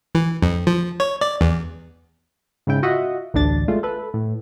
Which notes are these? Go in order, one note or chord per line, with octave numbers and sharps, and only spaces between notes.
E3
F2
F3
C#5
D5
E2
G#2 C#3 E4 G5
F4 F#4 D#5 E5 F#5
A1 D2 D4 A6
G#3 A3 F4
A4 B4
A2